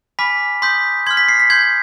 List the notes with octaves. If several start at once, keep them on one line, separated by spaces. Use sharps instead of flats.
G#5 B5 D6 F6 B6
C6 D#6 G6 B6
C6 F6 G#6
B6
C7
B6
C6 G6 G#6